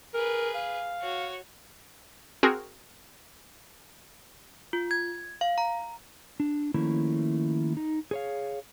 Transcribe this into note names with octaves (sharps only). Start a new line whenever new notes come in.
G#4 A#4 B4
F5
F#4 C#5
C4 F#4 G#4 A#4
F4
G#6
F5
A#5
D4
D#3 F3 A3 A#3 C#4 E4
D#4
G#4 C#5 F5